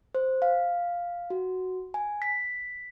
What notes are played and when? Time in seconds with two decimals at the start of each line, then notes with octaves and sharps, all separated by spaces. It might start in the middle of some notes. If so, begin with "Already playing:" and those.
0.15 C5
0.42 F5
1.30 F#4
1.94 G#5
2.22 B6